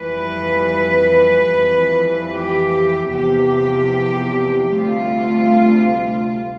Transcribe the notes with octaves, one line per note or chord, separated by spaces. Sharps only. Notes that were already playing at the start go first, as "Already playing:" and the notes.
Already playing: F2 E3 G3 B4
F2 E3 G3
G4
E2 C3 F3 G4
D2 C3 G3 F4